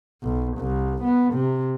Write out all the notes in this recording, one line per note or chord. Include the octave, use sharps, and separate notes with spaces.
B1
C2
B3
C3